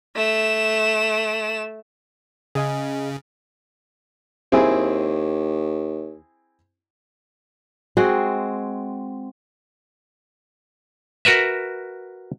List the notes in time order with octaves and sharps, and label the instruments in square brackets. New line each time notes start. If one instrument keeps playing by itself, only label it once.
[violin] A3 E7
[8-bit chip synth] C#3 [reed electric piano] G#4 D#5 G#5
[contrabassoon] D#2 [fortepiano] C4 E4 G#4
[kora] G#3 C4 F#4 G#4
[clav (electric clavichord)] F#4 A#4 B4 E5